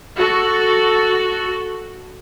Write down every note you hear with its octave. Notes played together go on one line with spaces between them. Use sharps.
F#4 A4